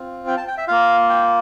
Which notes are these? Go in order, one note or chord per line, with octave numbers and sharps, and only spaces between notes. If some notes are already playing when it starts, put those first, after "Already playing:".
Already playing: C4 F4
G5
A5
G5
E5
A#3 F4 F5
G5